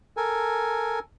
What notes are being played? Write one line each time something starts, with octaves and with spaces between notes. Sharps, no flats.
A4 A#4 G#5